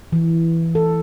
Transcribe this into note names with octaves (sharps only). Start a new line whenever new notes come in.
E3
A4